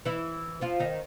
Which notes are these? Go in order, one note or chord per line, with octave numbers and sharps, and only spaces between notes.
E3 E4
F3 F4
D#3 D#4